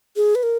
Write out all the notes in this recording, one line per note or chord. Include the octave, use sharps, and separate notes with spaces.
G#4
B4
A#4